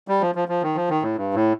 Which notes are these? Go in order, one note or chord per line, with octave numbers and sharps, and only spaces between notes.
G3
F3
F3
F3
D#3
F3
D#3
A2
G2
A2